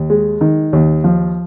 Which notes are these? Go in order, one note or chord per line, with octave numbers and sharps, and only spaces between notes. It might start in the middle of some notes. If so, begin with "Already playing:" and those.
Already playing: D#2
G#3
D#3
D#2
F3